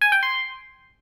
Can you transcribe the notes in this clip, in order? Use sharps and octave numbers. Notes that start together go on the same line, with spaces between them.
G#5
G5
C6